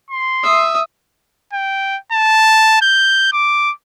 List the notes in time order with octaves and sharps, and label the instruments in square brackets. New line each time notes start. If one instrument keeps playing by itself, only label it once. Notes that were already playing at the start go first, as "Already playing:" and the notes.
[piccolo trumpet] C6
[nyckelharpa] E5 D#6
[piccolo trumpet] G5
A5
G6
D6